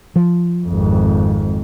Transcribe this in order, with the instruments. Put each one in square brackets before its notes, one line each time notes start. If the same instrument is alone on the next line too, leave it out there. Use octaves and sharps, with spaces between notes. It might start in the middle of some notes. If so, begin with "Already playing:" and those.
[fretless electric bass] F3
[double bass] G#1 F2